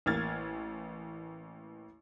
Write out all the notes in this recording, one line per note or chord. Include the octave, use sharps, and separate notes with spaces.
A1 A#3 F6 G#6 A6